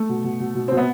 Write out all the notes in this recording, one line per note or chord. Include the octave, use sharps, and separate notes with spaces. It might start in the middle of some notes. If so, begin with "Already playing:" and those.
Already playing: A3
B2
B2
B2
B2
B2 C4
B3